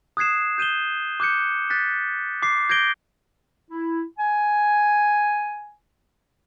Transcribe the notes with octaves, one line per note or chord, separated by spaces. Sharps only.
D#6 F#6 G#6 C7 E7
G6 D#7 E7 G7
D6 F#6 G6 C#7
F#6 A6 B6
D6 C7
G6 G#6 A#6 D7 G7
E4
G#5